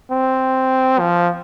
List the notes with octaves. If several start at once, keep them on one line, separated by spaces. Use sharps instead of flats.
C4
F3